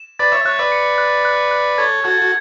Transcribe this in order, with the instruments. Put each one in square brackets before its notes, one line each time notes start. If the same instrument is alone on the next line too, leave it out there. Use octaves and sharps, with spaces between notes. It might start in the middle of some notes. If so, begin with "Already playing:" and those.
Already playing: [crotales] E7
[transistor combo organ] B4 D5 [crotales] A6
[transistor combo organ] C#5 E5
[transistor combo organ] C#5 E5 [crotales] F#6
[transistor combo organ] B4 D5
[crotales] C#7
F#6
F#6
F#6
[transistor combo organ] A4 C#5 [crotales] G#6
[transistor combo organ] F#4 A4 [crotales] G#6
[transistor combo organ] F#4